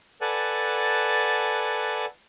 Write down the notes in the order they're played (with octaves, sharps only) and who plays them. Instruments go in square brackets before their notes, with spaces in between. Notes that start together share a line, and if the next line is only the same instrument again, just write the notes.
[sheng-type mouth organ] A4 B4 D5 F#5 G#5 A5